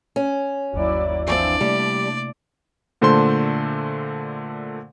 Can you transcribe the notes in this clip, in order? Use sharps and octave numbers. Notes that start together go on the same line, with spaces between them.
C#4
G1 D#2 F#3 E4 D5
E3 F3 C4 D4 D5
C3 G3 A3 A#3
A#2 D3 A3 C5 A5 C6